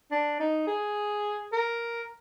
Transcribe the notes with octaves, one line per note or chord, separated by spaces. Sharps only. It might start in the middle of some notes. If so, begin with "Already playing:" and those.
D4
D#4
G#4
A#4